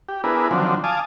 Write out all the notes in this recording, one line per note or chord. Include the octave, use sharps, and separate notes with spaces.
G4
B3 D4 E4 G#4 A#4 B4
D3 D#3 F3 F#3 C4 D4
F5 G#5 A5 D6 D#6